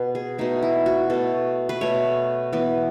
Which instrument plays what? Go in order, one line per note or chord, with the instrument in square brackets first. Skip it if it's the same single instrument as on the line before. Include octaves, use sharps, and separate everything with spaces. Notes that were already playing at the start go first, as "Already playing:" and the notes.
Already playing: [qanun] B2
G#4
B2 A3 D#4
E4
F#4
B2 A3 A4
B4
B2 A3 C#5
E3 B3